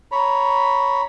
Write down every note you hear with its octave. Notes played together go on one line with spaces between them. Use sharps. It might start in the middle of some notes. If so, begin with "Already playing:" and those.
C#5 A#5 B5